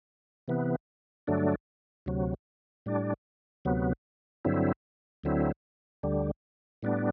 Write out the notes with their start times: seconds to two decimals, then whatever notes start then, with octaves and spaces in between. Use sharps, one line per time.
0.48 C3 E3 B3
1.27 G2 D3 F#3 A3 D4
2.06 D2 C3 F#3
2.86 A2 G3 D4
3.65 D2 C3 F#3 B3
4.45 G2 D3 F#3 C4 E4
5.24 D2 D3 F#3 C4 E4
6.03 D2 D3 G3
6.83 A2 G3 B3 D4